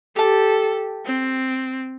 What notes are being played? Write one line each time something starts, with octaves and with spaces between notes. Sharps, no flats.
G4 A4 A5
C4